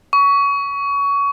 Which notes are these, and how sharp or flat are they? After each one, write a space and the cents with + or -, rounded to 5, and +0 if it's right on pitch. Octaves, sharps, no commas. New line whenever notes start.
C#6 +25